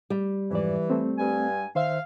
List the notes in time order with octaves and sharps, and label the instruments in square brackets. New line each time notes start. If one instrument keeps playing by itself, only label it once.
[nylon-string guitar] G3
[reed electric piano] F2 G#2 D5 [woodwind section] E3
[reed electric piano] A3 C4
[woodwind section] G2 G#5
[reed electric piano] D#3 C5 E5 [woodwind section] F5